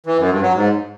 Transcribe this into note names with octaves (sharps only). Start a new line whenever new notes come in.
E3
F#2
G2
F#3
G#2